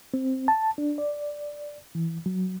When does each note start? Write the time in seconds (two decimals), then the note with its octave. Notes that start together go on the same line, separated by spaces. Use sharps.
0.14 C4
0.48 A5
0.78 D4
0.98 D5
1.95 E3
2.26 F#3